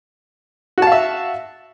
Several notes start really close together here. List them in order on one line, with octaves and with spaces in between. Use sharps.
F#4 A5 F5 E5